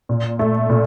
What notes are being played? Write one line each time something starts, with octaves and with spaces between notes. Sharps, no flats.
A#2
A3
A#2